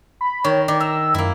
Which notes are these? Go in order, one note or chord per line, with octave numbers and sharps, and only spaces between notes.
B5
D#3 C#5
D#3 D5
A#5 E6
F#2 A#3 E4